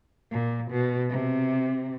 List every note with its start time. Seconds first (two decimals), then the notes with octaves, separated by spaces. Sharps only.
0.32 A#2
0.71 B2
1.10 C3